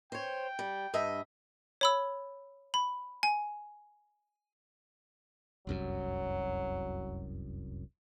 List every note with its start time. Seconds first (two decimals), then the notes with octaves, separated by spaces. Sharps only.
0.12 C5 C#5 G5
0.59 G3
0.94 G2 D#5 E5
1.81 C#5 B5 E6
2.74 B5
3.23 G#5
5.67 F1 C2 F#2 F#3